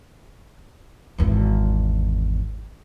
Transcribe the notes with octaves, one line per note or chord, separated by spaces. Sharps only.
G#1 E2